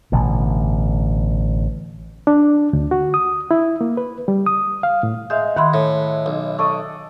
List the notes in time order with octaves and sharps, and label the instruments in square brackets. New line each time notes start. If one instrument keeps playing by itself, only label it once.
[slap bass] A1 B2 D3
[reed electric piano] D4
D2
F#4
D#6
E4
A#3
B4
G3
D#6
F5
A2
[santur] G#3 F5 [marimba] E5 G6
[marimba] D#3 B5 C6 [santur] E4 F#5
[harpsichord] A2
B1
[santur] A4 D5 D#6 [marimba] C#6